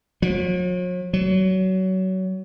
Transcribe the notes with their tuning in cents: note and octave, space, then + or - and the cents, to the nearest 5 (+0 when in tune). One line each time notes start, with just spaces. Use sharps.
F#3 -45
F#3 +25